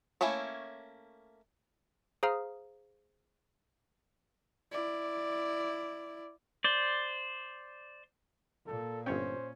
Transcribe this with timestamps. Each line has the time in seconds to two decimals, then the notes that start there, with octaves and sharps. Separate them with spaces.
0.21 A3 A#3 C#4 E4 C#5
2.23 G#4 C5 F5 A#5 D#6 F6
4.72 E4 D5
6.64 C5 D5
8.67 A#2 A4
9.06 G1 C#4 C5 C#5 G5